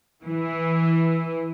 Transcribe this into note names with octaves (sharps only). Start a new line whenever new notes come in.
E3